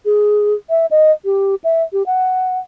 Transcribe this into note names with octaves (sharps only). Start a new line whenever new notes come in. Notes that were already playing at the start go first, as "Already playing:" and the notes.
G#4
E5
D#5
G4
E5
G4
F#5